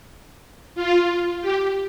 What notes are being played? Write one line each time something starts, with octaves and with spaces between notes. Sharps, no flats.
F4
G4